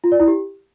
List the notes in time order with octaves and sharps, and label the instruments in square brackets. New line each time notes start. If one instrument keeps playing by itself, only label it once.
[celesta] F4
D5
E4
G4